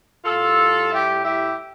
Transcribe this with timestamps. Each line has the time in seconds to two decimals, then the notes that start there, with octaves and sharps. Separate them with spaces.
0.25 A2 G3 F4 A4
0.92 E4 G4
1.24 E4 G4